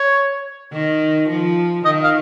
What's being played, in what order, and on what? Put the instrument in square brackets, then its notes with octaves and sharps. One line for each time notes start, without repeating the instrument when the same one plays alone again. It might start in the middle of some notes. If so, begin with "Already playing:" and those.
Already playing: [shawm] C#5
[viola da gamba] D#3
F3
[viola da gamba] D#3 [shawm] D#5
[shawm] F5